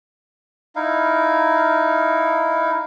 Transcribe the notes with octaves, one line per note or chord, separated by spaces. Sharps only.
D#4 E4 F5